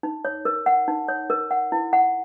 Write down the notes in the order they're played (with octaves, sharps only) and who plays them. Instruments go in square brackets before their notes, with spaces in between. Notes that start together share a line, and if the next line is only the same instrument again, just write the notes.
[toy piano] D#4
C#5
A#4
F#5
D#4
C#5
A#4
F#5
E4
F#5